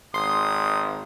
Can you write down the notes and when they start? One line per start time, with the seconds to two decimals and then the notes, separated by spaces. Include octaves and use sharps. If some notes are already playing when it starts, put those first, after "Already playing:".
0.14 G#1 C6 D#6